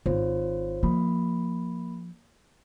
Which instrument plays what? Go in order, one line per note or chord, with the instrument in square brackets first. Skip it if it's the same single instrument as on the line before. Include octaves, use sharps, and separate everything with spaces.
[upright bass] G#1 [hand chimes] F4 C5 C#5
[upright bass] F3 [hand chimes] A#3 B5